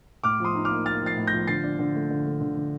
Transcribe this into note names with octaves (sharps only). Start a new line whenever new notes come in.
A2 D6 F6
F3 C6 D#6
D#4
D6 F6
A#3
A#3 F6 A6
F3
A6 C7
A2
G6 A#6
F3
D3 A6 C7
D4
D3
A3
D3
A3
D3
D3